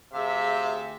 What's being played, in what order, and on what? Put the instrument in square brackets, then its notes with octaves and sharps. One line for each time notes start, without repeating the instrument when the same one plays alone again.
[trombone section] D2 G#4 [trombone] C3 [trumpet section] E5 [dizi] F5